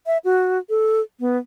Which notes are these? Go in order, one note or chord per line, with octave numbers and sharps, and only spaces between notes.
E5
F#4
A4
B3